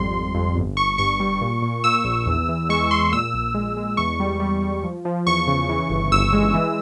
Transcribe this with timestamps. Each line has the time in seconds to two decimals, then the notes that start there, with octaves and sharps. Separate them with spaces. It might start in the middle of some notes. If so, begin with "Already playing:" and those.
Already playing: G#1 F2 G3 C6
0.13 F2
0.35 F2
0.56 G1
0.77 G1 C#6
0.98 G2 C#6
1.20 G3
1.41 A#2
1.62 A#2
1.84 A#2 E6
2.05 A#1
2.26 E2
2.49 E3
2.69 G#3 C#6
2.91 G#3 C6
3.12 A#2 E6
3.34 A#1
3.54 G#3
3.77 G#3
3.97 E2 C#6
4.20 G3
4.40 G3
4.62 G3
4.84 F3
5.05 F3
5.26 E2 C#6
5.47 C#3
5.69 E3
5.90 G1
6.12 G1 E6
6.33 G#3
6.54 E3